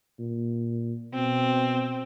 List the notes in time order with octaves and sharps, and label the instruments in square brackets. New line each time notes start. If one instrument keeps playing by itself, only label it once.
[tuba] A#2
[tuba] B2 [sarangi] C4